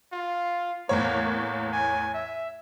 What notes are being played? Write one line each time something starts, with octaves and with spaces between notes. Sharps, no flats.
F4
E2 A2 A#3 C#5
A#3
G#5
E5